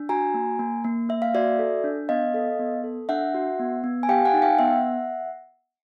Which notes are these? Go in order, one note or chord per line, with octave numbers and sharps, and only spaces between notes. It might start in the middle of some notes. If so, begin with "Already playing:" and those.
Already playing: D4
F#4 G#5 A#5
A#3
A#3
A#3
A#3 E5
F5
F#4 D5 E5
A4
D4
B3 D#5 F5
A4
B3
A4
D4 E5 F#5
F#4
B3
B3
G#5
G4 F5 G5
F#5 G#5
D#4
F5 G5
B3 E5 F#5